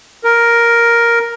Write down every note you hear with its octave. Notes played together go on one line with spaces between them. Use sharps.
A#4